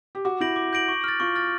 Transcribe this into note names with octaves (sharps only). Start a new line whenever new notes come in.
G4
F#4 D6
E4 G6 A#6 D7 F#7
D6
G6 A#6 D7 F#7
C#6
F6 A6
F4 C#6
F6 A6